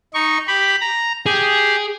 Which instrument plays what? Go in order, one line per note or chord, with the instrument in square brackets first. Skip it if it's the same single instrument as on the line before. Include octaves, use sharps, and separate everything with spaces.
[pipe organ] D#4 C#6
G4 B5
A#5
[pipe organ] G4 [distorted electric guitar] G#4